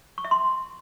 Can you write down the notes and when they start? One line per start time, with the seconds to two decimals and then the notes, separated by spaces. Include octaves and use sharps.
0.18 C#6
0.25 E5
0.31 C6